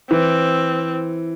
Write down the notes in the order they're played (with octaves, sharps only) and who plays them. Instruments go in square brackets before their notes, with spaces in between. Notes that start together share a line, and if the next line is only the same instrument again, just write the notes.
[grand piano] E3 [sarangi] C4